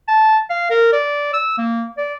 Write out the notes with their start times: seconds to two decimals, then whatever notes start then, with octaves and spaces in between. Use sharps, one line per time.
0.08 A5
0.50 F5
0.70 A#4
0.93 D5
1.34 E6
1.58 A#3
1.97 D5